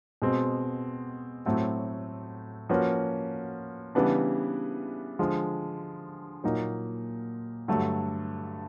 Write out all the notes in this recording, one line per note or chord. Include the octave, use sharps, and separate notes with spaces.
B2 G#3 C4
A2 F#3 A3 C4
F3 A#3 C#4 F#4 B4
C#3 E3 G3 B3 D4
D3 F3 G#3
A#2 F#3 A#3 D#4
G2 D3 F#3 A3